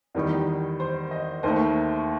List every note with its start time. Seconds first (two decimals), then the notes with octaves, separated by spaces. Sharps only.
0.15 E2 D#3 G3 D#4
0.80 C5
1.11 D#5
1.43 D#2 D#3 A3 C5